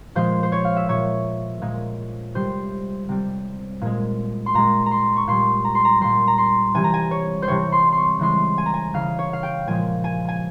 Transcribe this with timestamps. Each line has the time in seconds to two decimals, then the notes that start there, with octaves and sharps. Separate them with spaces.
0.15 A#2 F3 G#3 C5
0.43 C5
0.52 C#5
0.65 F5
0.76 E5
0.89 A#2 G#3 C#5
1.62 A#2 G#3
2.35 C3 G3 C5
3.09 C3 G3
3.81 A#2 G#3
4.46 C6
4.54 A#2 G#3 A#5
4.86 A#5
4.91 C6
5.16 C#6
5.27 A#2 G3 C6
5.65 A#5
5.75 C6
5.85 A#5
6.01 A#2 G3 C6
6.27 A#5
6.38 C6
6.74 C3 E3 G3 G#5
6.84 A#5
6.94 G#5
7.11 C#5
7.42 C5
7.47 C3 E3 G3 C#5
7.72 C6
7.92 C6 C#6
8.19 C#3 E3 G#3 C6
8.58 G#5
8.66 A#5
8.74 G#5
8.94 C#3 E3 G#3 F5
9.19 C#5
9.33 F5
9.43 G5
9.67 A#2 F3 G#3 G#5
10.04 G#5
10.29 G#5